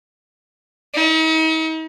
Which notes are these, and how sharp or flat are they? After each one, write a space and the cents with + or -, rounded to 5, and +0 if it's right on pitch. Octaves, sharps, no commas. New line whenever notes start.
D#4 +45